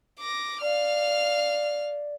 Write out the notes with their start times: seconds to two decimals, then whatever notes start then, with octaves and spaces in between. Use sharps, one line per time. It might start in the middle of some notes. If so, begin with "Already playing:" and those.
0.20 D6 A#6
0.62 D5 F5 F6